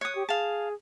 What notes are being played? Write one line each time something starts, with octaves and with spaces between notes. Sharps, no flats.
C#5 D#6 F#6
G4
G#4 F5 A5